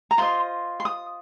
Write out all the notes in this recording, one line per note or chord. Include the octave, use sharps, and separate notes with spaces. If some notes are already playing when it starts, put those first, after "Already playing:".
A#5
F4 C5 D#5 C6
C6
D#6